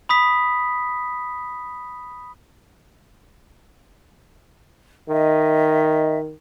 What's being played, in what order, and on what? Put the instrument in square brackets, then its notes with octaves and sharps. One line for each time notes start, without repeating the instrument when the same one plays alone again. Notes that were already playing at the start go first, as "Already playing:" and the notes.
[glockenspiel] B5 D#6 B6
[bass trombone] D#3 [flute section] D#5 E5